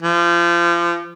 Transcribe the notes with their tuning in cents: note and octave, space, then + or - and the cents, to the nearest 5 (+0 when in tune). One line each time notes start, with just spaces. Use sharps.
F3 -30